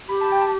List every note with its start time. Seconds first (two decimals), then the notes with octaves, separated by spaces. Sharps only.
0.09 G4 B5
0.21 A5
0.32 G5
0.42 A5